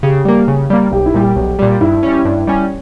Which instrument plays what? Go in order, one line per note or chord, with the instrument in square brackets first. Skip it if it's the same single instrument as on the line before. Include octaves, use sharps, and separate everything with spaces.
[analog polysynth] C#3 [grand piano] G4
[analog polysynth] G3 A#3
C#3
G3 A#3
[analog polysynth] B1 [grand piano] G4
[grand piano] E4
[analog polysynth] A#2 G3 [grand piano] G4
[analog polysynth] B1
A#2 G3
[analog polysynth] G2 [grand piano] E4
[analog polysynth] G3 C#4
G2
G3 C#4